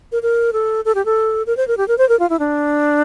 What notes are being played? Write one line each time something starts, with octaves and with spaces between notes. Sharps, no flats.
A#4
A#4
A4
A4
G4
A4
A#4
C5
A#4
G4
A#4
C5
A#4
F4
E4
D4